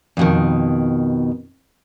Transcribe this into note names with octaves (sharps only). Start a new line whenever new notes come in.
F2 B2 D#3